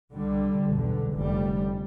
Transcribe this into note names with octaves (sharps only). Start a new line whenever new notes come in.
C2 D3 G3
B1 E2 D3
F1 D3 G3